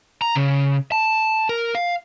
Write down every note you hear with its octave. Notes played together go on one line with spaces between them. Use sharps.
A#5
C#3
A5
A#4
F5